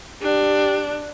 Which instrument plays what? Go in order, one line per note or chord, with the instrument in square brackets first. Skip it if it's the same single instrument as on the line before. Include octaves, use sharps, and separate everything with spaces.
[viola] D4 [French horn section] G4